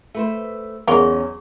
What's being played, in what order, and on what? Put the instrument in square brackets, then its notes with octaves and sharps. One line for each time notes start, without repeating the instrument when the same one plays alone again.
[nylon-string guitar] A3 B4 C5
[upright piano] E2 [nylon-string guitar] B2 C#4 [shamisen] F#3 F4 A#4 [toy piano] G#4 C#6